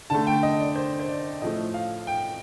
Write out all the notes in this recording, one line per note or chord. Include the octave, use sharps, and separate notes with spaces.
D3 A3 A5
G5
D#5
D5
C5
C5
D5
A2 F3 A3 D#5
F5
G5